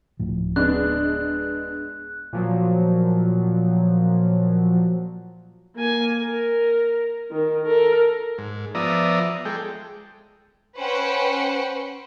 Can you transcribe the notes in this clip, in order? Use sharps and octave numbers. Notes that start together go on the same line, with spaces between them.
D1 A2 F3
G#3 B3 D4 F#6
A#2 F3 F#3
A#3 G#5
A#4
D#3
A4 A#4
G#2
F3 B3 D5 E5 A#5 D#6
G#3 A4 G5
C#4 B4 C5 F#5 G5 C#7